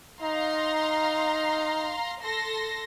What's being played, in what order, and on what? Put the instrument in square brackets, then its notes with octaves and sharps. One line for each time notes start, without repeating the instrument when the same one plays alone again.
[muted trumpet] D#4 [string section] F5 A#5 C6
[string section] A4 C6 A#6